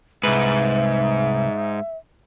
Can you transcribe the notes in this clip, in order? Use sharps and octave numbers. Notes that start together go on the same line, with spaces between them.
C2 G#2 B4 E5